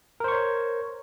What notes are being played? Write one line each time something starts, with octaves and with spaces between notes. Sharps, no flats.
A#4 C5 C#5 C#6